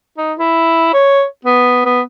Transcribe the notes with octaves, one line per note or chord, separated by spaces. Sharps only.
D#4
E4
C#5
B3
B3